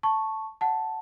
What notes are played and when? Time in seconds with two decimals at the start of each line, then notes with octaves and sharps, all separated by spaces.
0.03 A5 C#6
0.61 F#5 A5